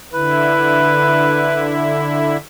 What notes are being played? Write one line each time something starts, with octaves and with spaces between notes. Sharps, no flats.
D3 E4 B4